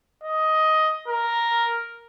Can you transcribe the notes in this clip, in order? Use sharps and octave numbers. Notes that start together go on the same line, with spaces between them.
D#5
A#4